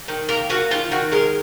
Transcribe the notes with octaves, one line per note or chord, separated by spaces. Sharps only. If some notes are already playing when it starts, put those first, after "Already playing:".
D#3
A#3 A#4
A#3 F#4
D#3 F4
D#3 F#4
G#3 A#4